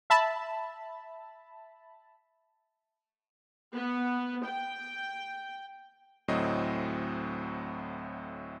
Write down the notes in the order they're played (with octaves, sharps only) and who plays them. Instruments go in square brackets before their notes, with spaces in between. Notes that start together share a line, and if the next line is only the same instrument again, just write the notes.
[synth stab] E5 A5 B5
[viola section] B3
G5
[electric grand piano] D2 A2 F#3 C4 D#5